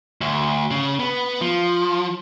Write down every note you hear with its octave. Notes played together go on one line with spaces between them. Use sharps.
D2
C#3
B3
F3